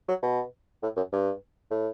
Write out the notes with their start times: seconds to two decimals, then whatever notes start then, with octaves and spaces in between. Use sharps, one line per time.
0.08 F#3
0.22 B2
0.83 A2
0.96 F#2
1.12 G2
1.70 A2